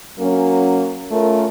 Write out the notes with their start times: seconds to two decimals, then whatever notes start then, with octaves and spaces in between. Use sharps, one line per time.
0.20 F#3 A#3 C#4
1.12 A3 C#4 F4 A#4